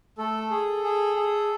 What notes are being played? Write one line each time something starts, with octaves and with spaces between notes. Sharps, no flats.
A3 A4
G#4
G#4
G#4